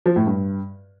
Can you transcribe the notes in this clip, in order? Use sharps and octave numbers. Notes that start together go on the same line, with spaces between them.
F3
A2
G2